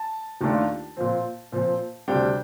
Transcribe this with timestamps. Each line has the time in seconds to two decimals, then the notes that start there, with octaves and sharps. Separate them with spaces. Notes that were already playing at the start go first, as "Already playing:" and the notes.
Already playing: A5
0.41 D#2 D#3 A3 D4 F4
0.97 A#2 F3 C4
1.52 A#2 F3 C4
2.08 D2 C3 G3 D4 G5